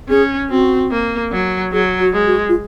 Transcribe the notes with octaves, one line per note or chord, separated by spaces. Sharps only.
C#4 G#4
C4 F#4
A#3
F#3
F#3 G#4
F#4
G#3
F#4
F4